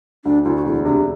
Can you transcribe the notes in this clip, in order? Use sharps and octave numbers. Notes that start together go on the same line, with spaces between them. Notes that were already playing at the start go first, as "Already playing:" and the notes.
D2 D4
D2 E4
F#4
E1 E4
C3 D4